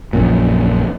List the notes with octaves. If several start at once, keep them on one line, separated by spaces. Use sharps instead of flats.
A#1 F#2 A#2